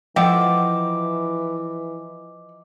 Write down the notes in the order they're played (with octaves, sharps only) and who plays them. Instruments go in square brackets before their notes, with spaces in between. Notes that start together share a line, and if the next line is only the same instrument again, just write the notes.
[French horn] E3 [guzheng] F3 E5 [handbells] D#5 D6 [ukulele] F#5 G5